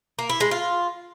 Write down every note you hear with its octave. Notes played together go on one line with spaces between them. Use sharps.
A#3
E4
G#3
F4